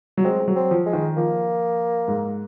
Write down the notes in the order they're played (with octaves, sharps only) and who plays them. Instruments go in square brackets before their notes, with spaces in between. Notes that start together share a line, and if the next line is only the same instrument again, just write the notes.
[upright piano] F#3
[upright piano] G#3 [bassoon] C4
[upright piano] G#3
F#3
[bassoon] C4
[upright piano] F3
[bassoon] G#3
[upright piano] D#3
[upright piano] F3 [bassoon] A#3
[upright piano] G#2